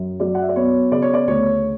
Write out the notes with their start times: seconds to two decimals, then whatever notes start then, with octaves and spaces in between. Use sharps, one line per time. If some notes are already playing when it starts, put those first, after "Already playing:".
Already playing: F#2
0.20 F#3 D5
0.35 F#5
0.42 E5
0.49 D5
0.56 B3 C#5
0.92 C#3 D5
1.02 C#5
1.14 D5
1.27 D2 C#5